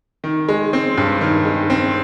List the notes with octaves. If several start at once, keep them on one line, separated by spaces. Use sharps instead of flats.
D#3
G#3
C4
G2
D#3
G#3
C4